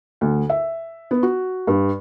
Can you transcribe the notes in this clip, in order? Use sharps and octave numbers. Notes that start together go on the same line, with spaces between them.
D2
E5
B3
F#4
G2